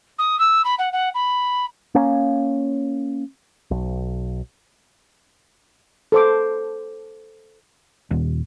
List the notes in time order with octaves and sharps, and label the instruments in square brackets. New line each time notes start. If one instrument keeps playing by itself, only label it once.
[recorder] D#6
E6
B5
F#5
F#5
B5
[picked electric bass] A#3 C#4
B1
[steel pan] A4 C5 D6
[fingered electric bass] D#1